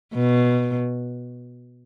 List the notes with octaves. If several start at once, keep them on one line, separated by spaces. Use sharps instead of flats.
B2